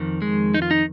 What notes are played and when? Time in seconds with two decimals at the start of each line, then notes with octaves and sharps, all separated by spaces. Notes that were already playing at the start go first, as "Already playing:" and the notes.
Already playing: F2 D#3
0.22 G#3
0.54 D#4
0.62 F4
0.71 D#4